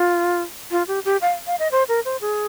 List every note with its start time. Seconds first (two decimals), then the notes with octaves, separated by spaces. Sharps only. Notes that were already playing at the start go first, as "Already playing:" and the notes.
Already playing: F4
0.71 F4
0.88 G4
1.05 G4
1.21 F5
1.47 F5
1.59 D#5
1.72 C5
1.88 A#4
2.05 C5
2.21 G#4